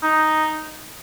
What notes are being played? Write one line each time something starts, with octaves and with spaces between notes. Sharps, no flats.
D#4